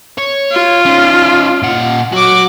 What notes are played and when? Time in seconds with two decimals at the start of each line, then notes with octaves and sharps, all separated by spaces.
0.18 C#5
0.52 F4
0.86 C#4 D#4
1.63 A#2 F#5
2.12 F#3 F#4 D6